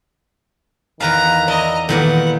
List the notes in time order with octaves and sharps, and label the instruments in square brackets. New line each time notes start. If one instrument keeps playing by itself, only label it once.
[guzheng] E2 B4 F5 [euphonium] D#3 [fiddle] A#5
[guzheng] E4 [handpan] D5 [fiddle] D#5 A#5
[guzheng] A#2 D#3 G3 [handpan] E3 E4 A4 [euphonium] B3 [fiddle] F#5